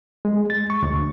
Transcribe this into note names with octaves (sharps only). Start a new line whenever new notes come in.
G#3
A6
C#6
D2